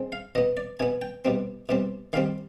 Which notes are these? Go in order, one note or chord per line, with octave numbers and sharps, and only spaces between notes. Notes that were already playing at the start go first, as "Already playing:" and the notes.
Already playing: G#3 C4
F5
B2 B3 D#5
D5
B2 B3 G#5
G5
B2 G3 C4
B2 G3 C4
D#3 G3 C4 F5